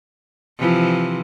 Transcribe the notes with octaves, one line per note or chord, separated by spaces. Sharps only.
C3 E3 F3